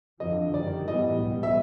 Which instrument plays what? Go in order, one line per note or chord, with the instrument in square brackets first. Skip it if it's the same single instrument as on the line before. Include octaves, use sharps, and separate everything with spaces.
[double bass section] F2 D3 F3 [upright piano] D#5
[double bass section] F#2 D#3 G3 [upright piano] D5
[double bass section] A2 E3 G3 B3 [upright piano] D#5
[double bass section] C#2 B2 G3 B3
[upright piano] E5